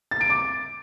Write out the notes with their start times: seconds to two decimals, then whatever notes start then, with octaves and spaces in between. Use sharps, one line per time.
0.11 A6
0.21 D7
0.30 D6